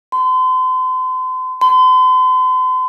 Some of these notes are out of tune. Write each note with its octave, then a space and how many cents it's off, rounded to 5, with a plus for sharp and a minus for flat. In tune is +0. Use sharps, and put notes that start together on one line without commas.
C6 -40
C6 -45